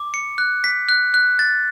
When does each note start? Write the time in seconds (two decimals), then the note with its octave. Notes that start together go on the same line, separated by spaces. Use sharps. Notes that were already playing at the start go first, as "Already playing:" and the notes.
Already playing: D6
0.14 C#7
0.38 F#6
0.64 B6
0.89 F#6
1.14 F#6
1.39 A6